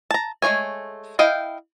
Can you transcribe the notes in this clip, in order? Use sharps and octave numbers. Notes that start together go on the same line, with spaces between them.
A5 A#5
G#3 A3 F4 C#5 G#5
E4 D#5 F5 G5